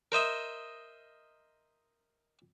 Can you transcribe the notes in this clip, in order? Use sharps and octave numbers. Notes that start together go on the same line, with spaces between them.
A#4 C5 D#5 E5